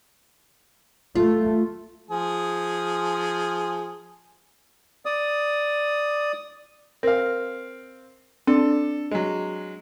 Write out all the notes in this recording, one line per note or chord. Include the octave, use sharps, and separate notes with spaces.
A3 F4
F3 G#4
D5 D#6
C4 A#4 F5
C4 D4 A4
F#3 G#3